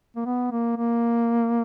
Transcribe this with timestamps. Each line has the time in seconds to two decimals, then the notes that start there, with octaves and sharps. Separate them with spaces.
0.16 A#3
0.25 B3
0.52 A#3
0.77 A#3